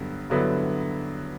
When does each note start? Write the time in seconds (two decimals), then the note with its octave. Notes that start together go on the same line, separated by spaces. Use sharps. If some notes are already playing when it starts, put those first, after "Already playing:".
Already playing: G2 D3 F#3 B3
0.30 G2 D3 F#3 B3 E4